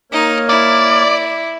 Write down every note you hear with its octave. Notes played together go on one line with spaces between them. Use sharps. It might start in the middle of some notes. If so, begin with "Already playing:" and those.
A#3 D#4 A#4 C#5
E4 D5